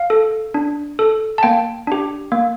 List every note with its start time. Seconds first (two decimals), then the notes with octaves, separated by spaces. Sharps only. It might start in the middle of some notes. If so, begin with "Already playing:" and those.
Already playing: F5
0.10 A4
0.54 D4
0.99 A4
1.38 A5
1.43 A#3 G5
1.87 D4 G4
2.32 A#3